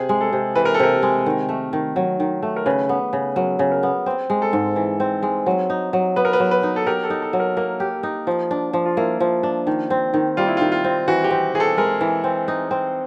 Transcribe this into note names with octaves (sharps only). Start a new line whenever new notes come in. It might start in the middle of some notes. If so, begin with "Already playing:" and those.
Already playing: C3 G#4
G#3
A4
C3
E3 B4
A#4
A4
C3 A#4
G#3
D#3
A3
D#3
F#3
D#3
A3
A#4
C#3 B4
B3
C#3
F#3 A#4
C#3
A#4
B3
C4
G#3
A4
G#2
E3
C4
G#3
F#3
D#4
F#3
B3 B4
A#4
B4
F#3
B4
D#4
A4
G4 A#4
A4
D#4
A4
F#3
A#4
A#3 A#4
G4
D#4
F3
D4
F3
F4
A#3 E4
F3
D4
D#3
C4
D#3
G3 F4
E4
D#3 F4
F4
C4
E3 F#4
G4
C4
E3 G#4
A4
G#3 A#4
E3
C4
D#4
C4